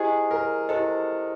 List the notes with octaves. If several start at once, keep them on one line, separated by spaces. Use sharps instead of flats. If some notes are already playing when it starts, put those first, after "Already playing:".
Already playing: E4 G4 G#4 C5 D#5
A#4
E4 G4 A4 C5 D#5